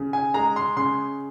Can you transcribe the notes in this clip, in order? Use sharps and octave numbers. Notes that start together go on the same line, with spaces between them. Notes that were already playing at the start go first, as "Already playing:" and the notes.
Already playing: C#3
G#5
G#3 A#5
C6
C#3 C6